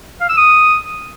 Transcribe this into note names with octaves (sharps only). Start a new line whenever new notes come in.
F5
E6
D#6